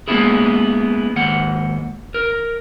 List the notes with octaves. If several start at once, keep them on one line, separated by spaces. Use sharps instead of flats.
G#3 A#3 B3 C#4 E4 G#4
D#2 G#2 F#5
A#4